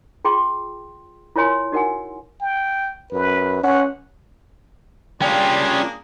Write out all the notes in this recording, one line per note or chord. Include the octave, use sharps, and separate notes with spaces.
F4 G#4 G5 C6
E4 F4 A#4 C#5 G#5 C6
D#4 F#4 A#4 F#5 G#5
G5
F#2 B4
C#4 F#5
G3 A#3 C#4 D4 F4 G#4 G5